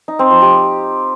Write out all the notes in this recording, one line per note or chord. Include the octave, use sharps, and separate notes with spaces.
D#4
C4
F3
G4